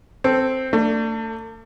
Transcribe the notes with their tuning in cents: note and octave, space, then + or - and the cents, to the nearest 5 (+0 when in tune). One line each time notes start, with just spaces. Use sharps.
C4 +0 A4 +0
A3 +35 D4 +0